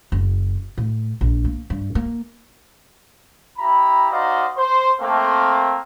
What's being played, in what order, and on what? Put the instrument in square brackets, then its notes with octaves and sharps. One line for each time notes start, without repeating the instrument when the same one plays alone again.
[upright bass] F#1
A2
A#1
A#3
G2
A#3
[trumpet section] E4 G4 A#5 B5
D#4 F#4 C5 D5 D#5 F5
C5 C6
A3 A#3 C4